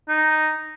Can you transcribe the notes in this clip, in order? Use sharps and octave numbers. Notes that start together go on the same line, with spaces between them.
D#4